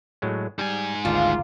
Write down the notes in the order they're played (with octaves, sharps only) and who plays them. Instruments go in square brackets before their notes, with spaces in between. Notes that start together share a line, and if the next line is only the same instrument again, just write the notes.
[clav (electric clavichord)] A2 F#3 G#3
[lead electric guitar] G#2 G#5 [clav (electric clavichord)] G3
[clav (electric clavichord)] G#1 D2 A5 [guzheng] A#3 [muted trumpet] F4